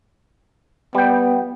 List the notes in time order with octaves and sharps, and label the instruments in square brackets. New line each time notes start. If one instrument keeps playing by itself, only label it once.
[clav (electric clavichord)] G3 G5 [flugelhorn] B3